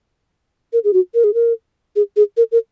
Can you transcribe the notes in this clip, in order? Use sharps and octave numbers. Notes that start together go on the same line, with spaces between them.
A#4
G#4
F#4
A#4
G#4
A#4
G#4
G#4
A#4
A#4